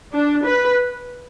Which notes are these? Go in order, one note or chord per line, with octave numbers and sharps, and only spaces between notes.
D4
B4